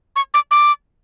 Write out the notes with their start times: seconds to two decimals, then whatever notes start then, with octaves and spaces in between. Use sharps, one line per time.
0.16 C#6
0.34 D6
0.51 D6